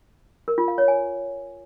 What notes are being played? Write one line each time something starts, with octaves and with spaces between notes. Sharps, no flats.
A#4
F4
F5
C#5
G#5